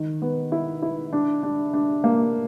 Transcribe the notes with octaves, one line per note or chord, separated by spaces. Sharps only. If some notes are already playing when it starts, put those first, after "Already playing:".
Already playing: D#3
B3
E4
E4
D4
D4
D4
A#3